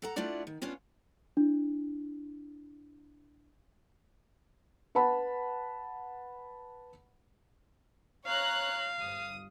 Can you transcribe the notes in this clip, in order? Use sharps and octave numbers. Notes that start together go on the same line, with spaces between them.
A4 F#5 A#5
A3 D4 E4 F4 D5 F#5
D#3
B3 C#4 D4 F4 F5
D4 E4
B4 F#5 A5 B5
C#5 F5 A#5 F#6
G1 D#6